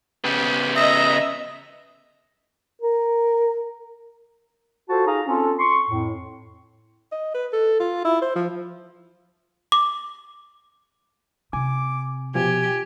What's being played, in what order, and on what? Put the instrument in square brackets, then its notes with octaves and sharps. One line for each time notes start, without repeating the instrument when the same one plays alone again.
[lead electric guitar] C#3 B3 [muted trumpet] G4
[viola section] D#5 E5 [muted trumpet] A#5 [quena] D#6
[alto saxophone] A#4
[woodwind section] F4 F#4 A4 C5 A5
D#4 G#4 F5 A#5
C4 C#4 F4 A4
C6 C#6
F2 A2
[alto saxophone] D#5
B4
A4
F4
E4
C5
F3
[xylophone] D6
[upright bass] C3 [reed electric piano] G#5 [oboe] D6
[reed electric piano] B2 F3 [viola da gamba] G4 [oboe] G#5